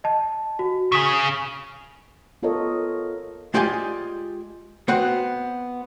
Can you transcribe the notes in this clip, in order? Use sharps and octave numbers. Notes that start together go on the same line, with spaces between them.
D#5 A5
F#4
C#3 G#4 D#6 B6 E7
B3 F4 A4 A#4 C#5 D#5
G#3 F4 G4 D5 D#5 G#5
B3 C4 F#4 B4